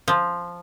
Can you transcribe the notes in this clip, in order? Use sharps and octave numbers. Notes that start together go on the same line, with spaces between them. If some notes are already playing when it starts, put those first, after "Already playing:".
F3